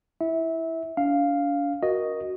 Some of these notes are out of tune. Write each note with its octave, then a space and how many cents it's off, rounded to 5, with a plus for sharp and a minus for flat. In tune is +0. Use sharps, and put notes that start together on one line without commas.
E4 +0 E5 -20
D4 -40 F5 +0
F#4 +0 A#4 +15 D#5 +0